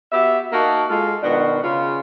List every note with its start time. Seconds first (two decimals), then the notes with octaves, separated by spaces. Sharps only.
0.12 B3 F#4 G4 E5
0.52 A#3 D#4 F#4 A#4 D#5 A5
0.90 G#3 F4 A4
1.23 B2 D#3 B3 D4 F4 F#4
1.63 C#3 F4